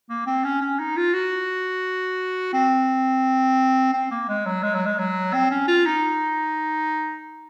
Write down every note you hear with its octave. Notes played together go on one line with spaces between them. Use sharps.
A#3
C4
C#4
C#4
D#4
F4
F#4
C4
C4
A#3
G#3
F#3
G#3
F#3
G#3
F#3
C4
C#4
F4
D#4